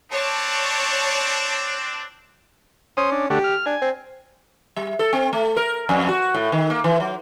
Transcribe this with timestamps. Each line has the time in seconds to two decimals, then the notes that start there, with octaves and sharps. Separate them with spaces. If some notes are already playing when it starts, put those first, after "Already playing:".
0.11 C4 D4 C#5 A5
2.97 C#4 C5 D#6
3.12 D4
3.30 D3 A3 F#4 G4
3.44 F6
3.66 D4 G#5
3.82 C4
4.76 G3
4.99 A4
5.13 C4
5.33 A3
5.57 A#4
5.89 F2
6.09 F#4
6.34 A2
6.52 D#3
6.70 A#3
6.84 E3
7.00 F#3